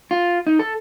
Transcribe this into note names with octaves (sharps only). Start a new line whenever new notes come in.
F4
D#4
A4